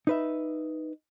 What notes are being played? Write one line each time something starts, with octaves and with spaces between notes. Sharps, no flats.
D#4 B4 E5